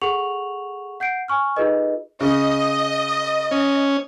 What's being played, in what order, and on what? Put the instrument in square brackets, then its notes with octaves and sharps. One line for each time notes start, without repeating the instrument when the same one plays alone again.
[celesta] G#4 A4 F#5 C#6 F7 F#7
F#5 G6 C7 D7
G#5 C#6 F6
D#4 F4 G#4 A4 B4 D#5
[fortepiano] C#3 [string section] D#5
[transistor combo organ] C#4